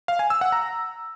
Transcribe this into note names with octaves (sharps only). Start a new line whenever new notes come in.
F5
G#5
E6
F#5
A#5